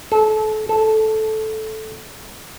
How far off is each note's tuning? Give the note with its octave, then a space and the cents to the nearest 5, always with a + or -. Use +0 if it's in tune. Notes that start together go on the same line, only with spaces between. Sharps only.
A4 -30
A4 -10